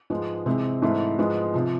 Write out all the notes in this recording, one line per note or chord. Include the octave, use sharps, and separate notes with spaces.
G#2 F3 G#3 B3
C3 E3 G#3 C4
G#2 E3 A3 C4 E4
G#2 F3 G#3 B3
C3 F3